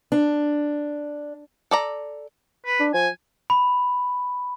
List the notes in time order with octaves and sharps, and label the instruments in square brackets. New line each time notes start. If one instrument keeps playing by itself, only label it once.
[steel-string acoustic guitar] D4
[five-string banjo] A4 D5 A#5
[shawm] B4
[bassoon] D4
[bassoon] F3 [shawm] G#5
[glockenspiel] B5